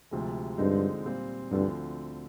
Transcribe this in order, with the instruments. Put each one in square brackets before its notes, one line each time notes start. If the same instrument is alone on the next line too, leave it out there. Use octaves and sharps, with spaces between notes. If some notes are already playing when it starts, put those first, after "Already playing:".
[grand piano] D2 C3 F3 G#3
[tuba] G2 [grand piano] D3 F3 G#3 C4 D#4
[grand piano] A#2 G3 C4 F4
[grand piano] D2 D3 F3 C4 [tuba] G2